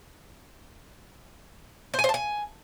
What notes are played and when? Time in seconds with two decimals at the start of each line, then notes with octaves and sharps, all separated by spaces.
1.94 C5
1.99 G#5
2.04 C5
2.09 A5
2.14 G#5